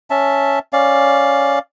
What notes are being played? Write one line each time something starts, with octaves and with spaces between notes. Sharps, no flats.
C#4 E5 A5
C#4 D5 F5